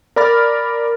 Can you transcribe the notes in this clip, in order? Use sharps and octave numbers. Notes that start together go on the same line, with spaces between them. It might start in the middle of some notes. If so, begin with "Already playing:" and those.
A#4 D5 B5 F6 A6